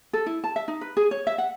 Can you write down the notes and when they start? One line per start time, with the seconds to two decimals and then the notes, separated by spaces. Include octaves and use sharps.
0.13 A4
0.26 E4
0.44 A5
0.56 E5
0.68 D#4
0.81 B4
0.97 G#4
1.11 C#5
1.27 E5
1.38 F#5